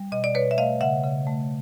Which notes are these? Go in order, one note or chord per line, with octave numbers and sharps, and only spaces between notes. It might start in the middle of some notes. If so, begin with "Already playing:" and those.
Already playing: G3
B2 D#5
D5
B2 B4 C#5
E5
A3 D#5 F5
C#3 E5 F#5
C#3
A3